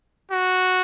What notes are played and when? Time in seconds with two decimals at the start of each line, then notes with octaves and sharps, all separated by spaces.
0.31 F#4